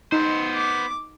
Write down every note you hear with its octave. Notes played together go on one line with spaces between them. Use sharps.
B3 D#4 C5
D6